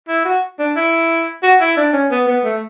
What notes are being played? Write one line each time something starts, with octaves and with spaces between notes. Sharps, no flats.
E4
F#4
D4
E4
F#4
E4
D4
C#4
B3
B3
A3